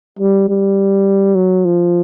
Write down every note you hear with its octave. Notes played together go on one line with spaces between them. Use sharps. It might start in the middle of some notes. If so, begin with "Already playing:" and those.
G3
G3
F#3
F3